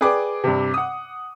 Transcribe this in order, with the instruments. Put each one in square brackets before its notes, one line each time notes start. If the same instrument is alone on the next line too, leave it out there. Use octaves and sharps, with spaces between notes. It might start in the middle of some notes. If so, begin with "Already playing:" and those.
[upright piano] G#4 B4 D5 G5 D6
G2 C3
F#5 D#6